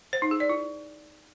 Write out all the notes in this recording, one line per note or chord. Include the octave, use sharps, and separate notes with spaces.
C5
D#4
G#4
D5
E4